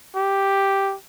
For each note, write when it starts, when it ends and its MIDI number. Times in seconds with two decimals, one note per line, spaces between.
0.16 0.95 67